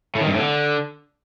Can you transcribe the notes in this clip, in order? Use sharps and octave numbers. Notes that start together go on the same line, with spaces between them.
A2
D#3
G2
A2
D3